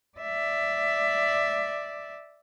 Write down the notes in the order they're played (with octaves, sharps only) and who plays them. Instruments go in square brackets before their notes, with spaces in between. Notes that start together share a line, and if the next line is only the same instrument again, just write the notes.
[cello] D5 E5